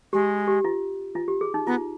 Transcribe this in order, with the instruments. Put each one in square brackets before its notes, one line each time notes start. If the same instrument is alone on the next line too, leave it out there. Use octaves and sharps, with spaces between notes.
[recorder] G#3 [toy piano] G4
[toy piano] G4
F4
F4
G4
G#4
D#4
[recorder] B3 [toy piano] F4